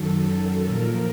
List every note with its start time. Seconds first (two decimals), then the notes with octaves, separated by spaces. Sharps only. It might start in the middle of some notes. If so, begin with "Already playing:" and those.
Already playing: F#2 D#3 F#3 A4
0.27 F#2 D#3 F#3
0.65 A#2 F3 A#4